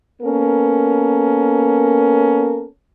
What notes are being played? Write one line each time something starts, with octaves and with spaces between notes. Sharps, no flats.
A#3 B3 C#4 A4 A#4